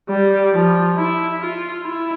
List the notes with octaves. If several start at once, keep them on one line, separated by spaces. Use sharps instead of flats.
G3
F3
E4
F4
E4